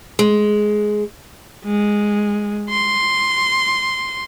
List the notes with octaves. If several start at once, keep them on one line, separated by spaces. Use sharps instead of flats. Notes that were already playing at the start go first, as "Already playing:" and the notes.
G#3
G#3
C6